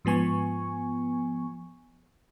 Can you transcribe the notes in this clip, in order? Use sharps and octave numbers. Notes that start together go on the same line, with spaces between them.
G#2 F3 B3 G#5 C#6